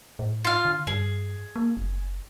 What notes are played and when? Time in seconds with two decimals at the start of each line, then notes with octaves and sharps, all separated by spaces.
0.19 A2
0.45 F4 F5
0.65 D3
0.87 G2 G#4
1.56 A#3
1.77 F#1